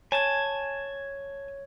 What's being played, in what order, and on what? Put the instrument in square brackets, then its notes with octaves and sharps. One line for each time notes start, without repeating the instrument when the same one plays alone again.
[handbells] C#5 G#6 [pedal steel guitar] G#5 A5